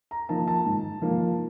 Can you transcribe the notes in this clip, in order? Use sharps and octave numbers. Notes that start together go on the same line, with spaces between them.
A#5
F3 A#3 D#4 A5
A5
G#2
F3 A#3 D#4